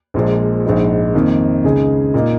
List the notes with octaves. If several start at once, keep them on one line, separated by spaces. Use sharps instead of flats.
A#1 A#2 F3 G#3
A#1 G#2 G#3 D#4
F2 D#3 A#3
C#2 C#3 G#3 D#4 G#4
A#2 A#3 D#4